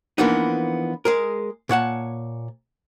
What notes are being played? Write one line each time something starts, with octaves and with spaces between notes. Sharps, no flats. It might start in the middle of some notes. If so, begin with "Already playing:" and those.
E3 F3 A#3 B3 D4 D#4
G#3 G#4 A#4
A#2 C#5 F#5 A5